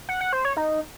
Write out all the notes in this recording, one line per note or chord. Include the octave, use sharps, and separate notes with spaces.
F#5
F#5
C5
C#5
D#4